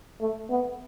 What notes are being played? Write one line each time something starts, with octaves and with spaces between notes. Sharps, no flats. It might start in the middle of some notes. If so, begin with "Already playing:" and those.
A3
B3